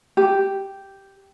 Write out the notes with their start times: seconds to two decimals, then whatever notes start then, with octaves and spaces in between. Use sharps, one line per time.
0.17 G4